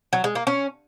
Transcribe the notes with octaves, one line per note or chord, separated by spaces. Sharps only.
F#3
G#3
A#3
C#4